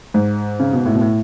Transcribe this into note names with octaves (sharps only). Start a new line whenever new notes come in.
G#2
C#3
B2
A2
B2
A2